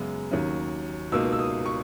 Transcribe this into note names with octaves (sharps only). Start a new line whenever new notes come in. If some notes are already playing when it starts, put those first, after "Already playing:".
Already playing: F#2 C#3 G#3 B3
D#2 D#3 F#3 C#4
C#2 B2 A#3 D#4 E6
E6
D#6
C#6